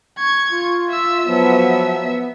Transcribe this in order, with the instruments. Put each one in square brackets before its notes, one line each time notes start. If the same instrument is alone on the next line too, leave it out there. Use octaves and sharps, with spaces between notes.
[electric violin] C#6 G#6
[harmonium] F4
[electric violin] E5 E6
[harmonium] F3 F#3 B3 [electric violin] E5
[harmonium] B3